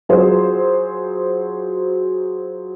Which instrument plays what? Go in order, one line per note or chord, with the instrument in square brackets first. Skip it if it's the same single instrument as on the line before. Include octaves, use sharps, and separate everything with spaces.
[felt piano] F#3 F4 F#4 G#4 C5